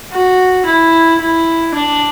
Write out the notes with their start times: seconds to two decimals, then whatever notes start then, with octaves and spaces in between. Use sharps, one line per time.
0.12 F#4
0.66 E4
1.20 E4
1.74 D4